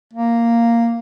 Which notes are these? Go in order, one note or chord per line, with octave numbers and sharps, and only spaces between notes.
A#3